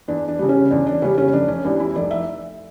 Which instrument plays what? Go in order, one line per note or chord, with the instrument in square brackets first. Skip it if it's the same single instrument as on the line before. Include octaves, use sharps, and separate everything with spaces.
[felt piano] E2 D4
D4
C#3 G3
C#4
E2 D4
D4
C#3 G3 C#4
C#4
F1 D4
C#4
E2 E3 G3 D4
E4
F1 D5
E5